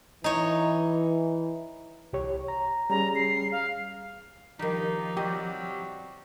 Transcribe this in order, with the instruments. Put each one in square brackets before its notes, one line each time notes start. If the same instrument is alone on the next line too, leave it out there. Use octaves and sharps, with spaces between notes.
[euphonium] E3 [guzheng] D#4 C#5
[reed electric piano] C2 G4 C#5
A#5
[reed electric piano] G3 C#4 G#4 [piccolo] A#5
[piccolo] C7
F5
[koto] D#3 G3 [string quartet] F3 [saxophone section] D#4 G4
[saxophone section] C3 F#3 G3 [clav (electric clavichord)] G4 [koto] D#5